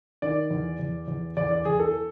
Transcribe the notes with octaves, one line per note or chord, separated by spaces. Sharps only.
D#3 D5
E2
E2
E2
E2 D5
D5
E2 G#4
A4